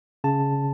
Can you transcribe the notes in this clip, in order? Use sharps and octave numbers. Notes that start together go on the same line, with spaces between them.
C#3 A5